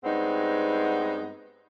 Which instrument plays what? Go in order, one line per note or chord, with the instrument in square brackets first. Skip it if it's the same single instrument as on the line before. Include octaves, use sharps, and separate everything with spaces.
[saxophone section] G2 G#3 B3 C4 D#4 F#5